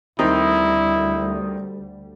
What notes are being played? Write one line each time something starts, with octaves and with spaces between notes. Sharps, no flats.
D2 D#3 G3 C4 D#4 E4 D#6